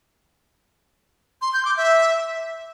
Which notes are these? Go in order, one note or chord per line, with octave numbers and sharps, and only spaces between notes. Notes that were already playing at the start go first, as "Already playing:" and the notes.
C6
G6
D6
E5